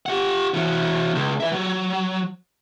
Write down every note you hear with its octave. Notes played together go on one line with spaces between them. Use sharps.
G4 F#5
E3 F#4
C#2
B4 E5
F#3